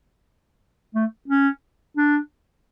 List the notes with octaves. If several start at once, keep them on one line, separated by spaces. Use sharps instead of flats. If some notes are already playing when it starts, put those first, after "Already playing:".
A3
C#4
D4